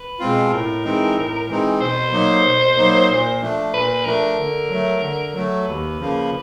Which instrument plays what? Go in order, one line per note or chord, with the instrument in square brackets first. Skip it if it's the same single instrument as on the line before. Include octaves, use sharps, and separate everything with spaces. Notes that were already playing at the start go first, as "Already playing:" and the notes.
Already playing: [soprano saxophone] B4
[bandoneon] B2 G#3 C4 F4
[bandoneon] A2 [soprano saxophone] A#4
[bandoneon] E3 G#3 C4 D#4
A2
E3 G#3 C4 D#4
[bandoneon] B2 [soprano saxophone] C5
[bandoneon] F#3 A#3 D#4
B2
F#3 A#3 D#4
A#2
F3 A3 D4
[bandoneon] A#2 [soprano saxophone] B4
[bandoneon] F3 A3 D4 [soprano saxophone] A#4
[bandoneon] D3
F#3 A3
D3
F#3 A3
[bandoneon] D#2 [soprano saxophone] B4
[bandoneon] C#3 F3 A#3